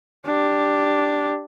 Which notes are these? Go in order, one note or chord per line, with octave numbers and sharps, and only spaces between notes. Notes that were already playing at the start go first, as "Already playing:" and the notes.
D4 G4